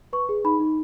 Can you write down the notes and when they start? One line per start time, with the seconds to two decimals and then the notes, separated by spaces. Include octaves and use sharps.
0.13 B4 C#6
0.29 G#4
0.44 D#4 B5
0.60 D#4